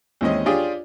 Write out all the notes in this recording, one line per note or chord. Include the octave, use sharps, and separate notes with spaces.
D#2 E3 G#3 C4 C#4 D#5
D4 F4 G4 G#4 C#5 D5